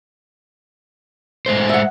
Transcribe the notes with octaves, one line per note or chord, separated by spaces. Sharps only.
G#3 A3 C5
E5 F#5